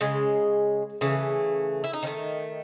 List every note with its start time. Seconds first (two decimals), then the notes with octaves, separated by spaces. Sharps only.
0.01 C#3 G#3
1.01 C#3 E3 A3
1.84 E4
1.93 D#4
2.03 D#3 C#4
2.07 A3